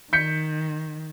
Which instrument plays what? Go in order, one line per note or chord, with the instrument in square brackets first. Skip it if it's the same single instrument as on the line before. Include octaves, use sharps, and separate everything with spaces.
[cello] D#3 [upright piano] G6 B6 C#7